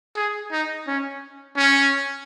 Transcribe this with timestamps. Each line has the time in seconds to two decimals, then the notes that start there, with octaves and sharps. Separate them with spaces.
0.16 G#4
0.52 D#4
0.87 C#4
1.57 C#4